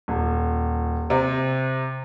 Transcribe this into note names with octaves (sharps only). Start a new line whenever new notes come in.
D#1
C3